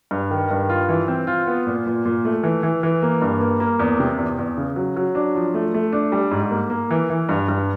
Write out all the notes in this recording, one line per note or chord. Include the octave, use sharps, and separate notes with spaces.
G2
D#3
G2
F4
E3
C4
F4
B3
A#2
A#2
A#2
A3
E3
E3
E3
A#3
G2
A#3
A#3
E2
C3
E2
E2
C#3
F#3
F#3
D4
F3
A3
A3
D4
G3
G#2
A#3
A#3
E3
E3
G2
G2